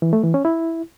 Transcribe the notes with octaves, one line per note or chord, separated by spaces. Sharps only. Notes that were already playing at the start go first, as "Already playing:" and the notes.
E3
A3
E3
C#4
E4